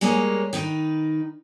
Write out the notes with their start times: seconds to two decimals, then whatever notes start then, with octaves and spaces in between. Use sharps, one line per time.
0.01 G3 G#3 A#3 G#4 A#4 C#5
0.53 D#3 D#4 B4